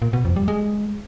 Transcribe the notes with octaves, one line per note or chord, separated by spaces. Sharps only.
A#2
B2
F2
G3
G#3